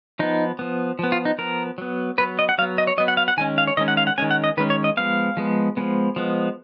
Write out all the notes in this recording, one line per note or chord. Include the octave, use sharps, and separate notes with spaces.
F3 B3 D#4
F3 B3
F3 B3
F4
D#4
F3 B3 A#4
F#3 B3
F#3 B3 B4
D#5
F#5
F#3 B3 F5
D#5
C#5
F#3 B3 D#5
F#5
F5
F#5
D#3 G#3 C#4 G#5
F5
C#5
D#3 G#3 C#4 D#5
F#5
F5
F#5
D#3 G#3 C#4 G#5
F#5
D#5
D#3 G#3 C#4 B4
C#5
D#5
F3 G#3 B3 F5
F3 G#3 B3
F3 G#3 B3
F3 G#3 B3